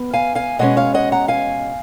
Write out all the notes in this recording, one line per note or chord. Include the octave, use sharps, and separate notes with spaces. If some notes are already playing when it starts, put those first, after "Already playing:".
Already playing: B3
F5 G#5
F5 G#5
B2 G#3 C#4 D#5 F#5
C#5 F5
D#5 F#5
F#5 A#5
F5 G#5